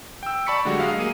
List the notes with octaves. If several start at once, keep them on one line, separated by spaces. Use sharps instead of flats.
G5 E6
D5 A5 B5 C#6 B6 C#7
D3 F#3 G#3 A3 F#4 G4
F#3 G#3 F#4 D#5 F5
A#3 G#4 D#7